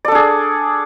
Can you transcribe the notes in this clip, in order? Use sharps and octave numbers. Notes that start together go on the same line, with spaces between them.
D4 G#4 A4 D5